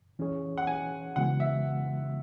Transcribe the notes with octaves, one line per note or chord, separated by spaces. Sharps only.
E3 C#4 G#4 C#5
F#5
G#5
C#3 E3 G#3 B3 F#4 F#5
E5